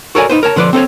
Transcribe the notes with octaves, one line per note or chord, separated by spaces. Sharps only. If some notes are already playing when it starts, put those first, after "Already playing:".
F#4 A4 A#4 C#5 D5 G#5
D#4 B4 C5
A#4 C#5 A5
D3 F3 B4 D5 C6
C4 A4 C5 C#5